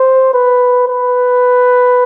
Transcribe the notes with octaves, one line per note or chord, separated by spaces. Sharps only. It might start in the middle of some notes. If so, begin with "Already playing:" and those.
Already playing: C5
B4
B4